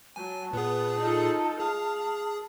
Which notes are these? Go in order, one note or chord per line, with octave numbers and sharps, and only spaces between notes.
F#3 G#5 A5
A#2 B3 G#4
D#4 F4 A4
G#4 F5